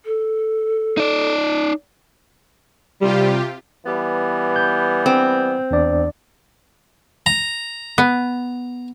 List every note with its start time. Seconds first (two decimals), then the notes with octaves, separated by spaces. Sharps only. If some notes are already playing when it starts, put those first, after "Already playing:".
0.05 A4
0.97 D#4 D5
3.01 C3 G3 F4 G4
3.86 E3 G3 B3
4.56 G6
5.06 C4
5.71 E2 D4 D5
7.26 A#5
7.98 B3